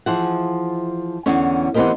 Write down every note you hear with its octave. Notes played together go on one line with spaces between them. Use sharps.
E3 F3 G#4 E5 F#5
E2 D3 C#4
E3 B3 C4 G4 A#4 D#5